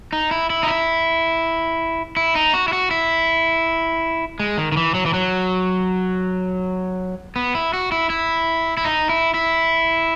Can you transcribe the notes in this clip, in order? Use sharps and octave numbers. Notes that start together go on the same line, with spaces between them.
D#4
E4
E4
D#4
E4
E4
D#4
F#4
E4
F#4
E4
G#3
D#3
D#3
E3
F#3
E3
F#3
B3
E4
F#4
E4
E4
E4
D#4
E4
E4